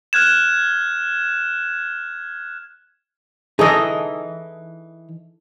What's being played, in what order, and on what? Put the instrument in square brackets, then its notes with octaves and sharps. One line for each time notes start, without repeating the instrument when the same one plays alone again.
[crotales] F6 F#6 G#6 E7
[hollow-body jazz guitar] E3 D#4 [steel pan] G#4 A4 D#5